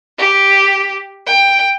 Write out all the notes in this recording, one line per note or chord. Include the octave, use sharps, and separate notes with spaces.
G4
G5